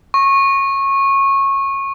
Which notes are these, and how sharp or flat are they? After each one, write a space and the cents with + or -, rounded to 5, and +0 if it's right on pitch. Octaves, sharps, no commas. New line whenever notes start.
C#6 -20